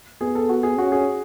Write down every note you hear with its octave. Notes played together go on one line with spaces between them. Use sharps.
B3 G#4
A4
F#4
G#4
C#4 F#4
G#4